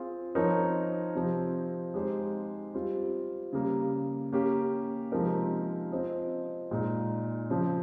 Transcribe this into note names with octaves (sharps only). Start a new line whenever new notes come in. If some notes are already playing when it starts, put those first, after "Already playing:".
Already playing: C4 F4 G#4
F3 C4 D#4 A#4 C#5
C3 F3 C4
G#3 D#4 G4 C5
G3 C4 F4
C#3 G3 A#3
A#3 C#4 G4
C3 F3 G#3 D#4 A#4
C4 F4 C5 D#5
A#2 G#3 D#4
C#3 F3 C4